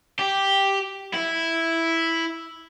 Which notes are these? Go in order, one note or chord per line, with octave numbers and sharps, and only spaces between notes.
G4
E4